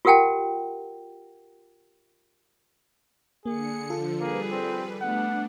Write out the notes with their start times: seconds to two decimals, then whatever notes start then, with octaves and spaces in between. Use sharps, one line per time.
0.05 F4 G4 A#4 F#5 G5 A5
3.46 D3 A#3 G#4 C#7
3.90 D3 F3 F4 A4
4.21 G3 A#3 G#4 B4
4.51 C4
5.01 A3 B3 D4 F#5